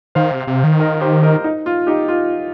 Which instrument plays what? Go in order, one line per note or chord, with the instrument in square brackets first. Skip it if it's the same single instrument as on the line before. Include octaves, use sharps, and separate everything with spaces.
[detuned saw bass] D#3 [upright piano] C5 F5
[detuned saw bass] C3
C3
D#3
[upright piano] A#4 D#5
G4 C5
A#4 D#5
D#4
F4
D#4 G4
F4